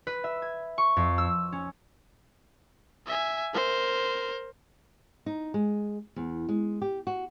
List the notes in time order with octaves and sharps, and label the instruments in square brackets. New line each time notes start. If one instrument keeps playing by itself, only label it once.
[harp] B4
E5
G#6
C#6
F2
E6
C#4
[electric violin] E5 G#5
A#4 C5
[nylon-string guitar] D#4
G#3
E2
G#3
G4
F#4